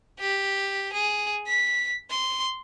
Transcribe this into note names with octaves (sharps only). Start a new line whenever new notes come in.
G4
G#4
B6
C6